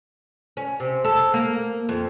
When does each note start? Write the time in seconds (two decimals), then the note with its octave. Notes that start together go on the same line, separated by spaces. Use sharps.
0.57 C#4
0.80 C3
1.05 A4
1.34 A#3
1.89 F2